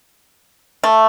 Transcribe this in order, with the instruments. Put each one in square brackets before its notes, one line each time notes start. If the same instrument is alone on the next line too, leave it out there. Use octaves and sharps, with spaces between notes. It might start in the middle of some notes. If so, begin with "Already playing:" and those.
[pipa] A3